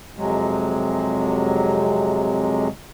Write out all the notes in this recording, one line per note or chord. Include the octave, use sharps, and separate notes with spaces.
F2 C3 F#3 G#3